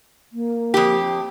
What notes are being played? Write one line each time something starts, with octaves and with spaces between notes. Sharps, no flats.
A#3
F2 G4